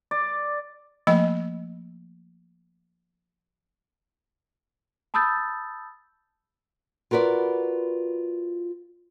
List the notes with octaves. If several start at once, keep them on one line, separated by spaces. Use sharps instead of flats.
D5
F3 A3 A#3 D#5 B5
A5 B5 D#6 E6 G6 A6
F4 F#4 A#4 B4 D5